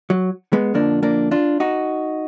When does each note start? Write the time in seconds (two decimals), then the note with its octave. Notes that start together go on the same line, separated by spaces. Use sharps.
0.10 F#3
0.53 G#3 B3
0.74 F2 D3 F3 A#3 D4
1.03 A#3 D4
1.31 D4 F4
1.60 D#4 F#4